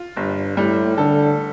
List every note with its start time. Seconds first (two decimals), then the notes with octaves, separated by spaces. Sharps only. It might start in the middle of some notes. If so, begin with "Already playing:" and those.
Already playing: F4
0.17 G1 G2
0.57 A2 G3
0.97 D3 A4